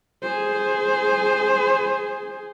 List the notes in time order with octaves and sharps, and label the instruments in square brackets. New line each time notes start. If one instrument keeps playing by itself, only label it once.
[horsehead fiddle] G#4 C5